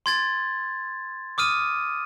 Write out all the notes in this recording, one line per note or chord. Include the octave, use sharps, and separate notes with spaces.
C6 G#6 A6
D6 D#6 F6 D#7